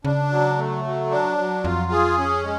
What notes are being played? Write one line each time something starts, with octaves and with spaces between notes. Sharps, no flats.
C#3 D4
F#3
A3
F#3
D4
F#3
F2 F4
G#4
C#4
G#3